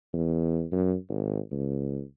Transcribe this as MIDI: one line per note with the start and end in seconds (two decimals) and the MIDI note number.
0.13 0.65 40
0.72 0.95 42
1.09 1.39 32
1.51 2.02 37